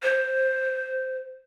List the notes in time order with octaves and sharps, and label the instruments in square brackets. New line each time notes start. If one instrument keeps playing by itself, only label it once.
[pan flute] C5